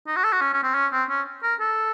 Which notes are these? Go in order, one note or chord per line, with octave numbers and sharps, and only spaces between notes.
D#4
F#4
A4
F#4
C#4
C#4
C4
C#4
C4
C#4
A#4
A4